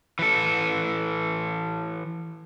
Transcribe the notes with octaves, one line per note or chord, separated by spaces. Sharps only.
E3 A4